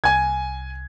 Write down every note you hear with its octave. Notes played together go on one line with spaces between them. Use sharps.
C2 G#5 G#6